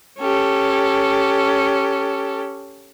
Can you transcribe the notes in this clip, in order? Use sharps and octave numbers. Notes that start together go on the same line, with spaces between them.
C#4 G4 A4